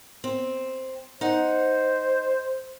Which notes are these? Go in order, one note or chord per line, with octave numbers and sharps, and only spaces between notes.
C4
D#4 C5 F#5